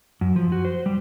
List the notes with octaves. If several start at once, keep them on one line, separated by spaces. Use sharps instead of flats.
F#2
F3
F#4
C5
G3